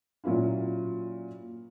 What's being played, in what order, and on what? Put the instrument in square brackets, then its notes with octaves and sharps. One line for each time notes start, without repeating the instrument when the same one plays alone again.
[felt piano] A#2 F#3 C#4 E4 F4